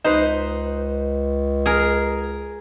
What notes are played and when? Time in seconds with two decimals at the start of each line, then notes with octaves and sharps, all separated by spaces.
0.04 C#2 D#4 B4 C5
1.66 G#4 A#4